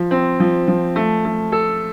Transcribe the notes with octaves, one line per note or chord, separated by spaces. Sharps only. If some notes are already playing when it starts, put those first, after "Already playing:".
Already playing: F3
C4
F3
F3
A3
A3
A4